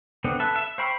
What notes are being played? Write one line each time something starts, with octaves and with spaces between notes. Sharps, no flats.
D3 B3 C4
A4 B4 E5
E5
C5 F5 G5 B5 C#6